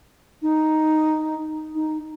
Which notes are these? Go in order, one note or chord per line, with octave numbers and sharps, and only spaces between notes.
D#4
D#4